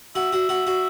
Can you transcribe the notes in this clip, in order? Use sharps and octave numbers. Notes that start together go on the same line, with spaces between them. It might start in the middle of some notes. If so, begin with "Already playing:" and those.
F#4 E5
F#4
F#4
F#4